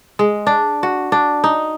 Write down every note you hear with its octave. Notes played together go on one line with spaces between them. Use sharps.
G#3
D4
F#4
D4
D#4